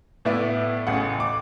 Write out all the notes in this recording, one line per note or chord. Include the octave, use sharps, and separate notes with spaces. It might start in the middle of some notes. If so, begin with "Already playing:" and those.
A2 B3 E4 D5
A1 C#3 F#5
D6